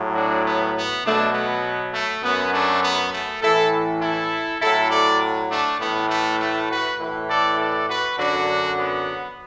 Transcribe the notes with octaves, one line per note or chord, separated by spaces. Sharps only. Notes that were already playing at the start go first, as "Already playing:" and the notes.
Already playing: A2 F#3
D4 F#4
B3
B3
B2 F#3 A3 D4
B3
A3
F#2 F#3 B3
A3 D4
B3
A3
A2 E3 E4 A4
E4 A4
A2 F#3 E4 A4
A4 D5
A3 D4
A2 E3 B3
A3
A3
F#4 B4
A2 E3
A4 D5
A4 D5
F#4 B4
F#2 D3 F#3 D4 F#4
B3